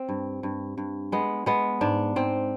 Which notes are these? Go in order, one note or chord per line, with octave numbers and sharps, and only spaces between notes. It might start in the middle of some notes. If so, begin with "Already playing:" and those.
Already playing: C4
G2
G2
G2
G#3 B3
G#3 B3
G#2 D4
G#2 C4